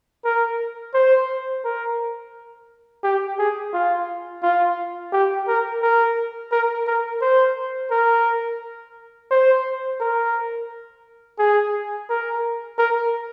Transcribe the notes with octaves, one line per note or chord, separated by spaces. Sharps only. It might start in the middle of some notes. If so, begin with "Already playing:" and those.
A#4
C5
A#4
G4
G#4
F4
F4
G4
A#4
A#4
A#4
A#4
C5
A#4
C5
A#4
G#4
A#4
A#4